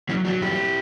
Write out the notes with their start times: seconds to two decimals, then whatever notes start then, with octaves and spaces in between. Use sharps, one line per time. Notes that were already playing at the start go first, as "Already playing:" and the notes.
0.09 F#3 C#4 E4
0.25 F#3 D4 F#4
0.41 G2 E4 G4